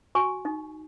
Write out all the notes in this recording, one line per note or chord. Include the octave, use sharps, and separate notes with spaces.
F#4 G#5 C#6
D#4